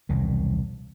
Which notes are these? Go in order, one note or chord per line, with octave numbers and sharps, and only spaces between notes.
E1 C2 D#3